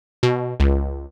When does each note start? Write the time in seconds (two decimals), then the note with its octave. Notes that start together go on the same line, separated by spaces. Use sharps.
0.23 B2
0.60 C#2